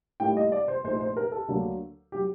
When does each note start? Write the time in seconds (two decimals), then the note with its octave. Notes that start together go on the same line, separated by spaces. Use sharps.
0.20 A2 G3 A#3 D#4 G5
0.37 D#5
0.52 D5
0.68 C5
0.84 A#1 A#2 A3 D#4 C5
1.00 C5
1.17 A#4
1.32 A4
1.48 D2 D3 F#3 A#3 D4
2.12 F#3 G4